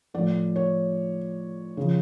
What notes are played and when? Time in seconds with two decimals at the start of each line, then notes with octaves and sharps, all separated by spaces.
0.14 A2 F3 D5
0.56 C#5
1.77 C#3 F3